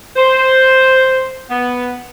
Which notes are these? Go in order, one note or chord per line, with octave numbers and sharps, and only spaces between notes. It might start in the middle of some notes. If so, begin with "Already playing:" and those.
C5
B3